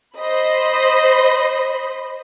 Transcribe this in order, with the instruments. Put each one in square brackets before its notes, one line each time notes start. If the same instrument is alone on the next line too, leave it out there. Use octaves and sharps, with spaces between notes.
[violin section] C5 D#5 B5